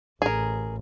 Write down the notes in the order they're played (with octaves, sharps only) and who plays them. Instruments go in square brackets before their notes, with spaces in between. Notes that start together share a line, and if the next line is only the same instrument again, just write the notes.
[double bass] A1 [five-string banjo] G#4 A#4